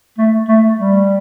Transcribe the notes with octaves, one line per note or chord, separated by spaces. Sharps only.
A3
A3
G3